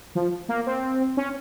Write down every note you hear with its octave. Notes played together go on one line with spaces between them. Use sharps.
F3
A#3
C4
C#4